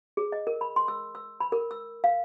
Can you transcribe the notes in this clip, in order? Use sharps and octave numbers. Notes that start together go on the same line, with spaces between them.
G#4
D#5
A#4
B5
C6
E6
E6
B5
A#4
E6
F5